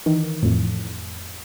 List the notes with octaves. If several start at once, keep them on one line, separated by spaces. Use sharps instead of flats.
D#3 E3
F2 A2